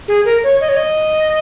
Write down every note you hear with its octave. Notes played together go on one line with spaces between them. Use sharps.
G#4
A#4
C#5
D#5
C#5
D#5